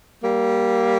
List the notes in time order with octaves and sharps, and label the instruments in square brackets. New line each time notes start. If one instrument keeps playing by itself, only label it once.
[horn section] G3 A#3